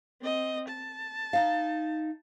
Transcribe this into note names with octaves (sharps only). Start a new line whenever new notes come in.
C4 D#5
A5
D#4 F5